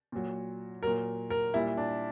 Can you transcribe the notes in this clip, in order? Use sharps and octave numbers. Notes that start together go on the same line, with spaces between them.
A#2 F#3
A#2 F#3 A#4
A#4
A#2 G3 E4
D4